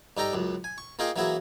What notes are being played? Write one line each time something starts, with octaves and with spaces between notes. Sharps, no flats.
G2 D#4 A4 G5 A#5
C#2 F#2
G#5
C#6
A#3 F4 G#4 D#5 F5 G5
E3 F#3 A#3 E4 F#4 G#4